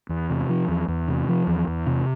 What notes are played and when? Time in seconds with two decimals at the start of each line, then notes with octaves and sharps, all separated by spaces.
0.09 E2
0.30 C3
0.49 F3
0.68 E2
0.88 E2
1.08 C3
1.28 F3
1.47 E2
1.67 E2
1.86 C3